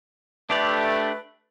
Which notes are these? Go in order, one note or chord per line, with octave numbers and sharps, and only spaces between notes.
A3 D4 G4 B4 D5